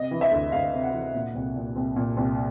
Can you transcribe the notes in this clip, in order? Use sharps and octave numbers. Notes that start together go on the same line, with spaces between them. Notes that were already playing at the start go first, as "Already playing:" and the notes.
Already playing: C3 D#5
E3
E5
D2
D2 F5
C3
F#5
E3
A#2
C2
A#2
C2
A#2
C2